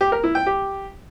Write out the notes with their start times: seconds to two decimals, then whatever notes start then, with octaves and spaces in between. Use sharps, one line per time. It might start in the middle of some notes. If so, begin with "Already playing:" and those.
0.01 G4
0.12 A#4
0.24 E4
0.35 G5
0.46 G4